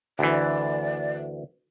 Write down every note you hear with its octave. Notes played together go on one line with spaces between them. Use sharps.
D2 E3 D5